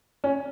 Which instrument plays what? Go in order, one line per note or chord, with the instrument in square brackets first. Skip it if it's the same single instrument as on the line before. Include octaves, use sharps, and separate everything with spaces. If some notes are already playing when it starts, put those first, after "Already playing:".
[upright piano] C#4